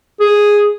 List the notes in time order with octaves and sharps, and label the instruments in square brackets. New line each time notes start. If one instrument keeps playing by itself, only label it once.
[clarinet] G#4